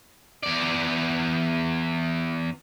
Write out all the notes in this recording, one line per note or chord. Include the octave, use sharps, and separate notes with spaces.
E2 D5